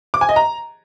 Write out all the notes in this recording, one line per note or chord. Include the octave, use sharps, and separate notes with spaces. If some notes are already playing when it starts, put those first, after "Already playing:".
D6
G#5
D#5
A#5